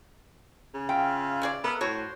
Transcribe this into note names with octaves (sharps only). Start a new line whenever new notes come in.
C#3
F4 E5 F5 G5
C#4 G#4 D5
B3 A4 A#4 E5
A2 F#4 C5 C#5 C6